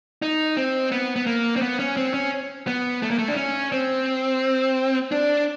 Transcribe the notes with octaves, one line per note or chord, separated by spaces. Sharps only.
D#4
C4
B3
B3
A#3
C4
B3
C#4
C4
C#4
B3
A3
A#3
A3
D4
C#4
C4
D4